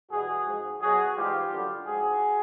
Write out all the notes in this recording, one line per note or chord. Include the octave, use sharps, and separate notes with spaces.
E2 B2 G3 F#4 G#4
G#2 F3
B2 F#3 F#4 G#4
G#2 E3 G3 F4 G4
F#2 D3 G3
G#2 F3 F#4 G#4